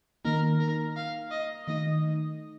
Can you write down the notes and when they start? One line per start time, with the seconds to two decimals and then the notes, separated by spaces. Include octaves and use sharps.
0.25 D#3 A#3 D#4 A#4
0.60 A#4
0.97 F5
1.31 D#5
1.67 D#3 A3 D#4 D#5